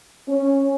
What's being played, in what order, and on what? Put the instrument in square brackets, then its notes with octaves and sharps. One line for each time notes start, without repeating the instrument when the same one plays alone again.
[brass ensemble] C#4